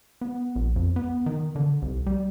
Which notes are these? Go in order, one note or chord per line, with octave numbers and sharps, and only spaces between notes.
B3
A#1
F2
B3
D#3
D3
C2
G3